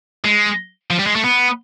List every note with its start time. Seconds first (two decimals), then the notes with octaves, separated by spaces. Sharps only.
0.25 G#3
0.90 F3
0.99 G3
1.06 G#3
1.15 A3
1.24 B3